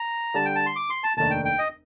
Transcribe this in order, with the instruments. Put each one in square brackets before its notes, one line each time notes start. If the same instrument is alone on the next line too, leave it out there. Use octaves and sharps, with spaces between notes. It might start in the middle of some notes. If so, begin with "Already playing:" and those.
Already playing: [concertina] A#5
[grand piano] D3 G3 D4 G4 [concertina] A5
[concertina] G5
A5
C6
D6
C6
A5
[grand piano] F1 D#2 D#3 A3 D4 [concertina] A5
[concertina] G5
G5
D#5